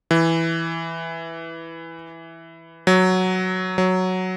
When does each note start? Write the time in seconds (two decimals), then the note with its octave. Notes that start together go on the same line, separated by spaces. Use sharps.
0.11 E3
2.87 F#3
3.78 F#3